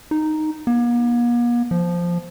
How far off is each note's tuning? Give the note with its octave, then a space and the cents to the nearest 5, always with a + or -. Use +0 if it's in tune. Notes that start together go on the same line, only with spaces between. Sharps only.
D#4 -5
A#3 +45
F3 -5